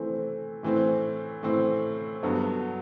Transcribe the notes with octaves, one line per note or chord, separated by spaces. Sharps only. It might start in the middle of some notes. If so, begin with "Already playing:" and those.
Already playing: E3 A3 C4
A2 E3 A3 C4
A2 E3 A3 C4
G2 F#3 B3 F#4 A4